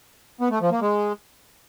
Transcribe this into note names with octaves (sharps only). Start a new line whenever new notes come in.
B3
A3
F3
A#3
G#3